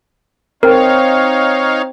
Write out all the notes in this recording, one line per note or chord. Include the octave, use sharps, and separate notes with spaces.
C4 D#4 A#4 C5 C#5 F5 G5